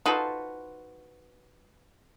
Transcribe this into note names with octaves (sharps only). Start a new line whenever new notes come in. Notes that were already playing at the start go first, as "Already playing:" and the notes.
D#4 F4 F#4 A4 B4 C5